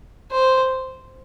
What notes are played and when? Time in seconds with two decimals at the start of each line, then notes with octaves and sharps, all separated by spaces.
0.31 C5